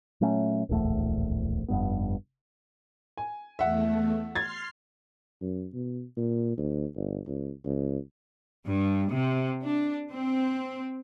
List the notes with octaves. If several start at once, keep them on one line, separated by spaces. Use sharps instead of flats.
A#2 F#3 A3 C#4
D1 A#1 E2 A3
F1 G2 B3
G#5
E2 A3 E5 F#5
C6 F6 G#6 A6 C7
F#2
B2
A#2
D2
G1
C#2
C#2
G2
C3
D4
C4